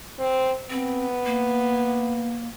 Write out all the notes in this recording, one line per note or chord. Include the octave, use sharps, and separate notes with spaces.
C4
B3 C4
A#3